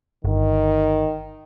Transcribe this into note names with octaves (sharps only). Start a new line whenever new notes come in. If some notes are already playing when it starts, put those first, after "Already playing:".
G1 D#3